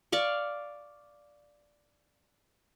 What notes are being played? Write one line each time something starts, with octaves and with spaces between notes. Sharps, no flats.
D5 F5 C#6